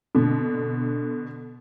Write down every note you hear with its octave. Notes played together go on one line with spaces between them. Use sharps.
B2 D3